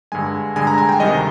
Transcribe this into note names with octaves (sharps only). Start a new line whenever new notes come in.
G2 D3 G#3 G#5
G2 D3 G#3 G#5
A#5
G#5
G5
D2 C3 D#3 G3 D#5